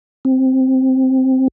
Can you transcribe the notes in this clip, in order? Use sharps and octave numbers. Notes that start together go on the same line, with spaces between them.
C4